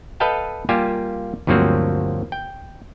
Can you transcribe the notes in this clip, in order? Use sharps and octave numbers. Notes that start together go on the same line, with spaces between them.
A4 B4 D#5 F5 G5 A5
G3 A#3 F4 G4 G#5
D2 G2 F3 F#3 A#3 C4
G5